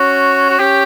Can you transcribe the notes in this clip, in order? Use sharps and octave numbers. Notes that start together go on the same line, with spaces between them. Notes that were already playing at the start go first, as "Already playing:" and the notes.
Already playing: C#4 F#4
F#4
C#4 G4